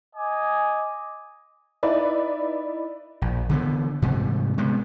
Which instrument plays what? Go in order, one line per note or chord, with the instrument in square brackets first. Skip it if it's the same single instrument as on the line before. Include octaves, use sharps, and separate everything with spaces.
[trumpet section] D#5 G#5 D6
[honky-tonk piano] D#4 E4 B4 D5
[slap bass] A#1
D3 E3 B3
G#2 C3 E3 G3
C3 G#3 B3